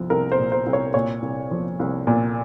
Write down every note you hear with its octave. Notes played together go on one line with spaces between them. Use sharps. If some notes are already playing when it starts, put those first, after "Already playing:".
Already playing: C2 F3
C2 A#4
C5
A#2
C5
C2
C#5
A#2 C#5
C2
F3
C2
A#2